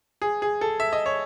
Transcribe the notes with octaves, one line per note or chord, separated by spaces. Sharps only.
G#4
G#4
A4
E5
D#5
C#5